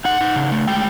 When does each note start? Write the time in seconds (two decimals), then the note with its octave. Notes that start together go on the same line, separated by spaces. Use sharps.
0.05 D#4 F#5
0.21 D#4
0.36 C#3
0.52 A3
0.67 G#3 G5